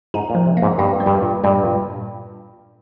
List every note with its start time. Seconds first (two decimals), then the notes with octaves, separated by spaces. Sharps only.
0.14 G#2 D#4
0.30 A#2
0.35 F3
0.46 C3
0.57 A#3
0.62 G#2
0.78 G2 A#3
1.00 G3
1.06 G2
1.23 A#2
1.44 G2 G3
1.65 A#2